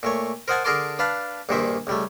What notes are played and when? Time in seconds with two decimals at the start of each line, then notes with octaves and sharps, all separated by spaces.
0.03 A#2 A3 C#5
0.48 A#4 C5 D#5 F#5 G#5 A5
0.64 D3 G#4 A#4 A5 C6 D6
0.99 D4 B4 F5 A5
1.49 A#1 G2 A#2 D#3 C5 E5
1.87 C#2 G3 A3